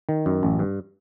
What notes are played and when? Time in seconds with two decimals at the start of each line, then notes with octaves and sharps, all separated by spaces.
0.09 D#3
0.26 F#2
0.43 A1
0.59 G2